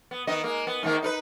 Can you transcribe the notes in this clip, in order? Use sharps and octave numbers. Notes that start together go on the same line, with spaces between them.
B3
D#3 B3 D#5
G#3 A#3
B3
G#2 D#3 A#3
D#4 A#4 B4